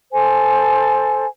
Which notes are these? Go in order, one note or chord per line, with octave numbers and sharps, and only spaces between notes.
A4 C5 G#5